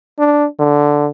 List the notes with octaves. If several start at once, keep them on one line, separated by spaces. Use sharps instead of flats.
D4
D3